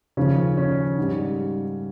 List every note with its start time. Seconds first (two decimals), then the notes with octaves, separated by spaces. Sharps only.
0.17 D#2 C#3 F3 C#4
0.57 C#4
0.98 G#2 G3